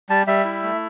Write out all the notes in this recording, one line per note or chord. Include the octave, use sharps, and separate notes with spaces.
G3 A5
G3 E5
E4
A3